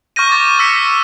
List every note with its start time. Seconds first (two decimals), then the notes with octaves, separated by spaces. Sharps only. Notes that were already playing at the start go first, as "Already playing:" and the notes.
0.16 C#6 F6 G6 A#6 D#7
0.29 D6 A6
0.59 E6 G6 A#6 B6 C#7